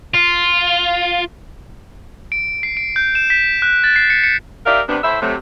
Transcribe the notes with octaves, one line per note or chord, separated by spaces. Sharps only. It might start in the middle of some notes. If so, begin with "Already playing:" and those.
F4
D7
C7
D7
G6
E7
B6
F#6
A6
C7
C#7
C#7
D#4 G4 A#4 D5 E5 F5
C3 B3 D4
A2 E4 C5 E5
C3 F#3 A3